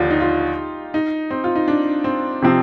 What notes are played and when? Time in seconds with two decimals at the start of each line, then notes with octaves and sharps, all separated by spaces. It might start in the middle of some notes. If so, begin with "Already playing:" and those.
Already playing: D#2 D3 F3 F4 G4
0.11 D#4
0.20 F4
0.94 D#4
1.31 C4
1.44 F4
1.56 D#4
1.68 D4
2.04 C4
2.42 C3 F3 C4